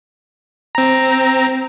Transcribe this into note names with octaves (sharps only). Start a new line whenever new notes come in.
C4 A#5